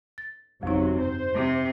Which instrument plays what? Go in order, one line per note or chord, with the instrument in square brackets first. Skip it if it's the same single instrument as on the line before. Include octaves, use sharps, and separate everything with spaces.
[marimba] A6
[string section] G1 C3 F#3 [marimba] F2 D#4
[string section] C5
[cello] C3